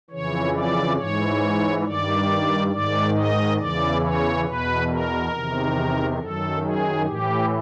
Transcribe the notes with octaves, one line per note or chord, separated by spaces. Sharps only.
F2 C#3 E3 C#5
D5
G#2 E3 C#5
G2 D#3 D5
G#2 D#3 D5
D#5
E2 C#3 E3 D5
C#5
E2 B2 B4
A#4
E2 C3 D#3
F#2 D#3 A4
G#4
A2 E3 G4